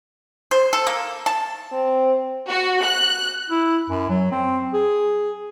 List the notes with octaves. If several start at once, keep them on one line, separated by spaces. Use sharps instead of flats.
C5
A4
A#3
A5
C4
F#4
F#6
E4
F#2
F#3
C4
G#4